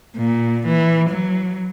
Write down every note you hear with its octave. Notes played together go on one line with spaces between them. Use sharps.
A#2
E3
F#3